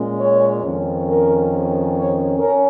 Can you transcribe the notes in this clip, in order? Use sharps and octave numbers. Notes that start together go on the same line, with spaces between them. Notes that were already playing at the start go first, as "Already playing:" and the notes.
Already playing: A#2 G#3 C#4
C#5
F2 D#3 C#4
A#4
C#5
C#4 A#4